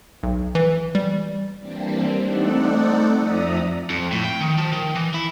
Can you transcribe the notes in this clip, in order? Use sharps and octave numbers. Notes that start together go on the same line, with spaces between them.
B1
E3
G3
E3 G3 A#3 C4 D4
A3 C4 D#4 A4 D5 F#5
F2 F3 D5 E5 A#5 D#6
F2
A2
G5
D#3
F3
D#3
E3
E4